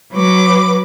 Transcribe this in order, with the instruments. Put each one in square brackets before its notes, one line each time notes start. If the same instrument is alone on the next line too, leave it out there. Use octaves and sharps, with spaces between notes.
[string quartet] F#3 B4 D6